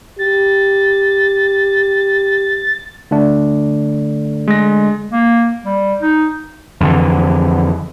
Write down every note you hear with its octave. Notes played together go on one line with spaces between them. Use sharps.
G4 A6
D3 A3 D4
G#3 A#6
A#3
G3
D#4
F2 D3 E3